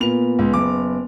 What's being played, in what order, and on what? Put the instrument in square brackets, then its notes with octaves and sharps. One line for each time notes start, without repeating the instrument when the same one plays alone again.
[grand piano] A#2 F7 [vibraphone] B3 B4
[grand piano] C#2
F#1 D6